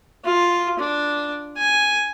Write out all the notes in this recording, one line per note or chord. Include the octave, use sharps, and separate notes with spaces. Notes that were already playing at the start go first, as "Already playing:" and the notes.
F4
D4
G#5